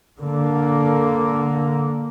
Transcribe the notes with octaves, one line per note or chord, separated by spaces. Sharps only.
D3 A#3